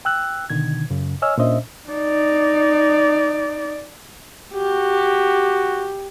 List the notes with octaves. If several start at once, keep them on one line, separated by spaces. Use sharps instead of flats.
G5 E6 F#6
B2 D3 D#3 G#6
F#2 C#3
C#5 D#5 G#5 E6 F6
A#2 C#4 D4 C5 D#5 E5
D#4 D5
F#4 G4